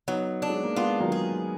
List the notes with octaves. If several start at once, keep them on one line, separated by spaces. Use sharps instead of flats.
F#3 B3 D#4
D4
G#3
A#3
G#3 B3 F4
D#3 F#3
G#4